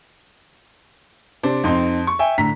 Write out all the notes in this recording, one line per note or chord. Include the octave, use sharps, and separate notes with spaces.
C3 D4 C5
F2 C4 D#4 C6
C#6
E5 G5 G#5
A2 D3 A#5 B6